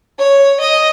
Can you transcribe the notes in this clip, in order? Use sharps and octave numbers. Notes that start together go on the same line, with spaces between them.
C#5
D#5